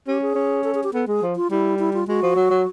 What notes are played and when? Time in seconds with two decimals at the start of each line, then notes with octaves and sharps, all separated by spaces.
0.08 C#4 G4
0.22 G#4
0.35 C#4
0.64 A4
0.74 G#4
0.83 G4
0.93 B3 A4
1.07 G#3 G#4
1.22 F3
1.36 F4
1.51 G3 E4
1.79 E4
1.93 F4
2.08 G#3 F#4
2.22 F3
2.36 F#3
2.50 F#3